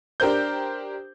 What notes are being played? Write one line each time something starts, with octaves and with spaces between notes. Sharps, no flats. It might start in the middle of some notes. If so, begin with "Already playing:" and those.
D4 G4 A#4 C5 G6